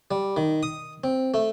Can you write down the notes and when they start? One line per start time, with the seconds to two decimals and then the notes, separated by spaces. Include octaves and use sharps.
0.11 G3
0.37 D#3
0.63 D#6
1.04 C4
1.34 A3